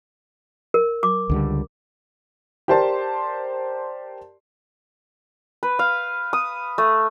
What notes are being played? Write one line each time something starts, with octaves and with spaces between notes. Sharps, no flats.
A#4
D6
C#2 D3 G3
G4 A#4 C5 D5 A5 C6
B4
F5
D#6
A3